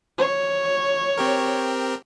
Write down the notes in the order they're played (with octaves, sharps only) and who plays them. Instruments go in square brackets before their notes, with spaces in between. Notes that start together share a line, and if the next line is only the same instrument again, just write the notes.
[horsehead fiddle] C#5
[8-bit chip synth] C4 G4 A#4